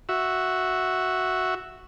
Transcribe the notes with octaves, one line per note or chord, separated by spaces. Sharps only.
F#4 E5